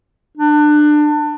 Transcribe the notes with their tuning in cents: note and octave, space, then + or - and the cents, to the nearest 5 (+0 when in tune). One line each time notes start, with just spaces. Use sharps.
D4 +25